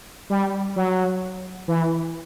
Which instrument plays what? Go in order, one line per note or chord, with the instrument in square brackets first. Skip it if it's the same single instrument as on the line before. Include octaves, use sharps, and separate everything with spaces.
[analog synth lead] G3
F#3
E3